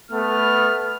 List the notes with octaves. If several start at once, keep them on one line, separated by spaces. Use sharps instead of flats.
A3 B3 F6